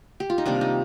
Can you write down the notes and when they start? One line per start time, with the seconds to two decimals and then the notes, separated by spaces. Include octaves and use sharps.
0.20 G4
0.30 F4
0.38 D#4
0.46 C3 D#3 G3 A#3 D4
0.61 D#4